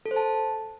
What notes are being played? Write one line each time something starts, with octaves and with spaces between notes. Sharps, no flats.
A4
C5
A5